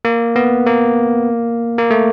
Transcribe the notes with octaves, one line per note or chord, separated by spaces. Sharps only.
A#3
B3
A#3
A#3
A3